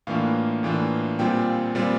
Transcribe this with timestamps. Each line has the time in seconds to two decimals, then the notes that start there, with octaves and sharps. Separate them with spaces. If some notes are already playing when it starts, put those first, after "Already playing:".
0.07 A2 E3 A#3 D4 F4 F5
0.63 A2 E3 A#3 D4 F4
1.19 A#2 G3 C4 F4 G5
1.75 A#2 G3 C4 F4